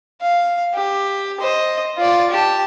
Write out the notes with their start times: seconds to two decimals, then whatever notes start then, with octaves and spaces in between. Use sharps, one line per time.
0.22 F5
0.75 G4
1.41 C5 D#5
1.98 F4 D5
2.31 G4 A5